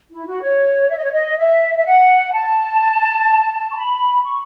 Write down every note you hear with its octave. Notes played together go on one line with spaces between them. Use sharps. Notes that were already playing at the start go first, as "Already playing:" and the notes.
E4
F#4
C#5
E5
D#5
C#5
D#5
E5
E5
F#5
A5
C#6
B5
C#6